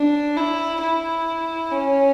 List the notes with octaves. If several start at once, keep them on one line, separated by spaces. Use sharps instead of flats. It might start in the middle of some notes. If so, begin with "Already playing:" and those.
Already playing: D4
E4
E4
C#4